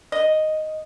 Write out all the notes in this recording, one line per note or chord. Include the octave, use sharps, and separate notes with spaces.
D#5